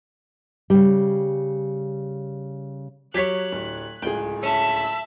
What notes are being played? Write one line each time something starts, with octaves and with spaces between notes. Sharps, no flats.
C#3 G3
F#3 G4 C#5 F#6 G#6 B6
D1
D1 C#2 G#4 G5
C#4 E5 A5 B5